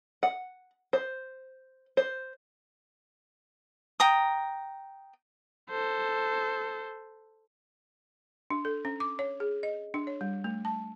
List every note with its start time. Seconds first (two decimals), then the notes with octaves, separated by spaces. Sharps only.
0.23 F#5
0.93 C5
1.97 C5
4.00 G5 A#5 D#6
5.69 A4 C5
8.50 D4
8.65 A4
8.85 C#4
9.00 D6
9.19 C#5
9.40 G#4
9.63 D#5
9.94 D4
10.07 C#5
10.21 G3
10.44 A3
10.65 A5